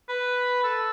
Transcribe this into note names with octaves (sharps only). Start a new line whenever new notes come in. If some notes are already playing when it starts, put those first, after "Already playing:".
B4
A4